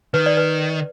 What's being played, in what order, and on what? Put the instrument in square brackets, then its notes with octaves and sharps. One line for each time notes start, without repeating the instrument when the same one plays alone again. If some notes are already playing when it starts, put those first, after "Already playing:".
[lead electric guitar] D#3 [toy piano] B4
[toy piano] D5
B4